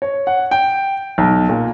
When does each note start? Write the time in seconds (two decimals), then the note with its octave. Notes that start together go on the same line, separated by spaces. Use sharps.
0.02 C#5
0.27 F#5
0.51 G5
1.18 B1
1.49 A#2